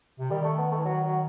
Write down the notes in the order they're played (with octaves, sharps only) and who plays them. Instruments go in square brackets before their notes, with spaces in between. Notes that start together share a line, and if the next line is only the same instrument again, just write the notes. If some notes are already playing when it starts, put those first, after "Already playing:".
[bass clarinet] C3
[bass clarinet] D#3 [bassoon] G3
[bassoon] A3
B3
A3
E3
F#3
F#3